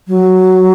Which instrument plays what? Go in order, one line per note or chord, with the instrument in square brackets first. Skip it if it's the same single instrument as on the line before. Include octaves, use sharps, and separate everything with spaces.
[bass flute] F#3